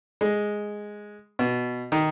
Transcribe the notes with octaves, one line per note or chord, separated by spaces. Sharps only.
G#3
B2
D#3